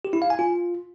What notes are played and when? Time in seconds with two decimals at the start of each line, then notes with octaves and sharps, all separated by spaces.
0.05 G4
0.13 E4
0.22 F5
0.30 G#5
0.39 F4